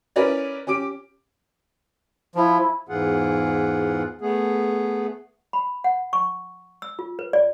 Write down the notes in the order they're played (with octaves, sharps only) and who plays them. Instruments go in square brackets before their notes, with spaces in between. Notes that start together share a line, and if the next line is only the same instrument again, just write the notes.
[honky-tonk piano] C#4 E4 A#4 B4 C#5 D5
C#4 G4 D6 D7
[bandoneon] F3 [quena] E4
[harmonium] E2 G#2 E3 F4 G#4 F#5
A3 B3 G#4
[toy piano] B5
F#5
C#6
E6
F4
B4
D5